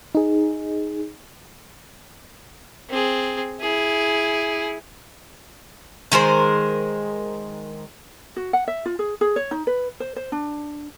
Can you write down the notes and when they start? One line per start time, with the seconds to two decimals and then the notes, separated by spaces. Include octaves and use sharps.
0.15 D#4 G#4
2.90 C4 G#4
3.61 E4 G#4
6.12 D#3 G#3 A#4 C5
8.36 F#4
8.53 F#5
8.68 E5
8.86 F4
8.99 G#4
9.21 G#4
9.36 C#5
9.51 D#4
9.67 B4
10.00 C5
10.16 C5
10.32 D4